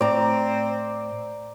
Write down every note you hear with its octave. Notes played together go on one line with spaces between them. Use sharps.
A2 C4 D5 A#5